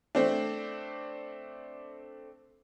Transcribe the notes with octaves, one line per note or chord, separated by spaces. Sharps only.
A3 C4 D4